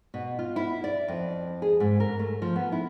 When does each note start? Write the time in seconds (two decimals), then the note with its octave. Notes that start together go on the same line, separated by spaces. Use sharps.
0.14 B2
0.39 F4
0.56 E4
0.84 D5
1.08 F2
1.62 G#4
1.80 G#2
2.00 A#4
2.19 A3
2.42 F3
2.56 B3
2.72 E4